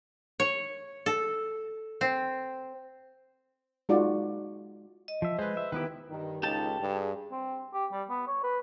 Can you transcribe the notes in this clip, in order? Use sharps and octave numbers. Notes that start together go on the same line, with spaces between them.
C#5
A4
C4
G#3 D#4 F4 F#4 D5
D#5
F3 E5
G#3 B4 C5
E5
D#3 B3 E4 G4 B4
G2 D#3
C#2 D#4 F4 G4 A4 A5
G2 G#4
C4
G4
G3
B3
C#5
B4